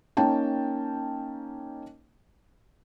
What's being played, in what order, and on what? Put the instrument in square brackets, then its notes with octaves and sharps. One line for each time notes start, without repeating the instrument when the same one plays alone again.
[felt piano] A#3 C#4 D#4 G5 A5